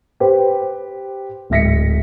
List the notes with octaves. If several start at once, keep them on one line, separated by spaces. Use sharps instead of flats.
G4 B4 C5
D1 G#2 E5 A#6 B6 C#7